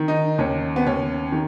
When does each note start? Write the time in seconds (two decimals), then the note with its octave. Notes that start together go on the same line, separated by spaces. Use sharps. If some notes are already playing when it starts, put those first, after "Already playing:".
Already playing: D#3
0.08 D#4
0.38 D#2 C#4
0.76 B3
0.86 D#2 C#4
1.32 D#3